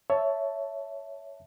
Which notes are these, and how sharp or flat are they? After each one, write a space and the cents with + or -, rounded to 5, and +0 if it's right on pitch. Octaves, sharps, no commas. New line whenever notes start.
C#5 +15 E5 +0 A5 +0